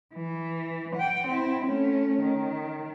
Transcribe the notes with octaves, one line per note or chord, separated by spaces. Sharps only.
E3
F#5 G5
C4 E4
A3 C#4
D#3